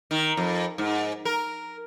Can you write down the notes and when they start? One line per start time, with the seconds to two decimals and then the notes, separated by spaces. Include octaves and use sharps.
0.11 D#3
0.37 F2
0.78 G#2
1.25 A#4